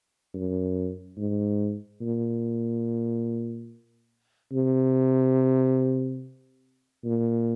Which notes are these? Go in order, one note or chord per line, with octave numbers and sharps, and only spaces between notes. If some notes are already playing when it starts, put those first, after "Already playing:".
F#2
G#2
A#2
C3
A#2